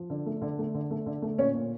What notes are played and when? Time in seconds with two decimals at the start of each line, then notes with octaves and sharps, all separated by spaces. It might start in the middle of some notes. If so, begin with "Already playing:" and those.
Already playing: F3
0.10 D3
0.26 A3
0.42 D3
0.59 A3
0.74 D3
0.91 A3
1.06 D3
1.22 A3
1.38 A#2 C#4 C#5
1.54 A#2